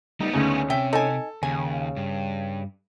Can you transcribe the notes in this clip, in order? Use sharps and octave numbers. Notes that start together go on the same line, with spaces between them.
G3 A3 B3 D#4
D2 C#3 C#4 D#4
C3 E5 G5
D#4 A4 G#5
D#2 C#3 G#5
G2